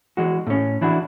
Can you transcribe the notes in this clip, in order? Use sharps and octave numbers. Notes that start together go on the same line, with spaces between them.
E3 G#3 F#4
A2 C#4
E3 D4 E4 F#4